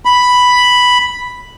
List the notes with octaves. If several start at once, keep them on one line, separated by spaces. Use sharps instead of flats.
B5